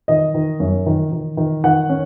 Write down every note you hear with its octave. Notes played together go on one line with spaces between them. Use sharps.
D#3 D#5
D#3
F#2
D#3
D#3
D#3
D#3 F#5
C#4